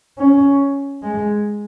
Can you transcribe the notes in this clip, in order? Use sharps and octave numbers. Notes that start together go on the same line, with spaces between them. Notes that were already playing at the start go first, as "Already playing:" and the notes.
C#4
G#3